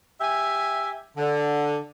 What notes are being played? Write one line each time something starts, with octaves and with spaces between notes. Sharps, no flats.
G4 E5 G#5
D3